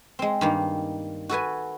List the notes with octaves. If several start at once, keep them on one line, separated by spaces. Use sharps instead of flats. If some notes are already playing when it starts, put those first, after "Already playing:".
G#3 C4
G2 D#3 A#3
F#4 A4 B4 G#5